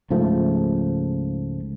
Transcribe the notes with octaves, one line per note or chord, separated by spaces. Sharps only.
C#2 G#2 F3 A3